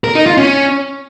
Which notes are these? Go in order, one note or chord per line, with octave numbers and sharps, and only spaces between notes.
A#4
D#4
F4
C#4